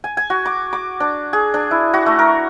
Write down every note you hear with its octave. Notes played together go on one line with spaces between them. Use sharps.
G#5
G#5
F#4
D6
D6
D4
G#4
D4
E4
F#4
A3
A#4